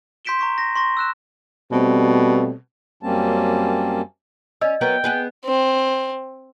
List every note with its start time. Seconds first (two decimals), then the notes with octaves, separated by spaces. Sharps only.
0.25 C6 G6 B6 D7 E7 G7
0.39 A#5 C#6 B6
0.58 A#6
0.75 C6 C#6 A#6
0.97 E6 F#6 E7
1.72 B2 G3 A3 C4
3.03 F#2 G3 A#3 C4 C#4 A5
4.61 C#4 D5 D#5 E6
4.81 F#3 B3 A#4 G5
5.04 B3 G#4 B4
5.45 C4